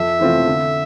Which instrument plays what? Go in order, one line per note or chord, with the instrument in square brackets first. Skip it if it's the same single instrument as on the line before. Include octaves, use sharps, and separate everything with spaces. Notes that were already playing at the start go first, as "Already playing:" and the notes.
Already playing: [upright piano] F2 [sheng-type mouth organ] E5
[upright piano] E3 A3 C4 F4
D3